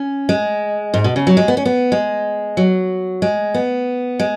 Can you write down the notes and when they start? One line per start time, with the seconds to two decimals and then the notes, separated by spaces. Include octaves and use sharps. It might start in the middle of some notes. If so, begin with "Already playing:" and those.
Already playing: C#4
0.29 G#3
0.94 G#2
1.04 B2
1.16 C#3
1.27 F#3
1.37 G#3
1.48 B3
1.57 C#4
1.65 B3
1.92 G#3
2.57 F#3
3.22 G#3
3.54 B3
4.19 G#3